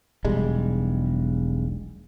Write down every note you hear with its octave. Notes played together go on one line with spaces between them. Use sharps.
E1 B1 G3 G#3